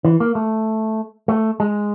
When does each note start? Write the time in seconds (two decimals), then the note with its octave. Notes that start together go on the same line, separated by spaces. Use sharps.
0.05 E3
0.20 A#3
0.35 A3
1.28 A3
1.60 G#3